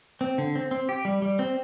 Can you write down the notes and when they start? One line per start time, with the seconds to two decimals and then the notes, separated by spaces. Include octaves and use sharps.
0.21 C4
0.38 D3
0.55 C4
0.71 C4
0.89 G4
1.05 G3
1.22 G3
1.39 C4